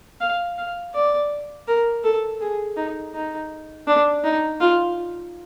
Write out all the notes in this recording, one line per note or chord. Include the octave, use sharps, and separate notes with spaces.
F5
F5
D5
A#4
A4
G#4
D#4
D#4
D4
D#4
F4